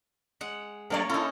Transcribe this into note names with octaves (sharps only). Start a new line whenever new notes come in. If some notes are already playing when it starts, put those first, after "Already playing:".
G#3 F#5
F#2 A3 A#3 A#4 C#5 D5
C#4 D#4 E4 A4